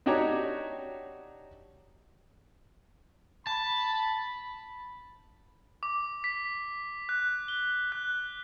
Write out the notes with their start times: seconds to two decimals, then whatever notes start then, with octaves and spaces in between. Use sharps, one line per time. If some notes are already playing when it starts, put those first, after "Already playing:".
0.06 D4 D#4 F#4 G4 C#5 A#5
3.47 A5 B5
5.83 D6
6.24 B6
7.09 F#6
7.48 G7
7.92 F#6